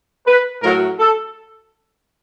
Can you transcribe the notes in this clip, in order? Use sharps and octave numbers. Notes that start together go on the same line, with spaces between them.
B4
A2 F#3 A3 A#4
A4